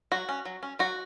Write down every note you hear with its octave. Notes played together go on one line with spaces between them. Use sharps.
F#3 F#4
C#4
F#3
C#4
F#3 F#4